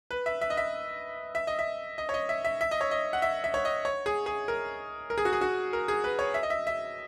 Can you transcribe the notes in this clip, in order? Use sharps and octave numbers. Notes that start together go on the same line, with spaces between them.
B4
E5
E5
D#5
E5
E5
D#5
E5
D#5
C#5
D#5
E5
E5
E5
D#5
C#5
D#5
F#5
E5
E5
C#5
D#5
C#5
G#4
G#4
A#4
A#4
G#4
F#4
G#4
F#4
A#4
G#4
B4
C#5
E5
D#5
E5
E5